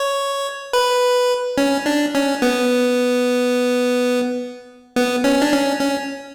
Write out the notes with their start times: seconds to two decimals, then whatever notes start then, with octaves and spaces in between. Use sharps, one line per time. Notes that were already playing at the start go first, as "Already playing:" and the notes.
Already playing: C#5
0.73 B4
1.58 C#4
1.86 D4
2.15 C#4
2.42 B3
4.96 B3
5.24 C#4
5.42 D4
5.53 C#4
5.81 C#4